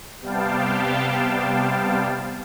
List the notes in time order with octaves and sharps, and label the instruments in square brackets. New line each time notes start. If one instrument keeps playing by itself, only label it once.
[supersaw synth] C3 G3 B3 F5 G5 A5